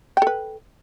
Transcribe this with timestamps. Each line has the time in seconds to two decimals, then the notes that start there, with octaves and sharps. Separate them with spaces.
0.17 G5
0.22 A4
0.27 B4